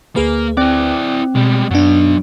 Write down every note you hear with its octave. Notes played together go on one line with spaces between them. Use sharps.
D2 A#3 G#4 B4
C4 E4 D5
B2 G3 G#3
F#2 F#3 B3 D4